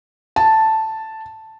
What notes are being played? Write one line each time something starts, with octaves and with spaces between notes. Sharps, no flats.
A5